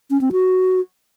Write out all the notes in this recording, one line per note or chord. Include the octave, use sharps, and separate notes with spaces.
C#4
C4
F#4